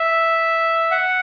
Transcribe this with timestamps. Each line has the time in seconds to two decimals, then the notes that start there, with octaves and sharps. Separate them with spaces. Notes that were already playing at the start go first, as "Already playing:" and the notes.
Already playing: E5
0.91 F#5